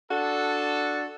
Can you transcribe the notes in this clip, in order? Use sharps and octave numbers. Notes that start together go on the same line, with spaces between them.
D4 F#4 A4